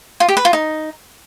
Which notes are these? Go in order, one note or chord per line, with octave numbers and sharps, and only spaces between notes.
F4
G4
B4
F4
D#4